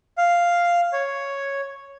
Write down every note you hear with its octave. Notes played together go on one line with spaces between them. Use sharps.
F5
C#5